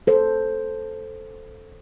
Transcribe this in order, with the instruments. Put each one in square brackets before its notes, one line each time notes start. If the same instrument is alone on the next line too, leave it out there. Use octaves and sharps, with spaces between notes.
[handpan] A4 C5